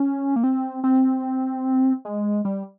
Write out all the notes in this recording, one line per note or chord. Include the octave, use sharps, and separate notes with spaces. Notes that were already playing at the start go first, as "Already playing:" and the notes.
Already playing: C#4
A#3
C4
C4
G#3
G3